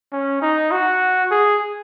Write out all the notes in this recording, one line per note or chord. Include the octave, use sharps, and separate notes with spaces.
C#4
D#4
F#4
G#4